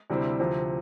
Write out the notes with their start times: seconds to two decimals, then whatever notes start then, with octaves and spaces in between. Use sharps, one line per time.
0.10 D2 C3 G3 C4 E4
0.40 D2 C3 F3 C4